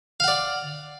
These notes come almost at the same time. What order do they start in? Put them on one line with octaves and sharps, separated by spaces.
F5 F#5 D5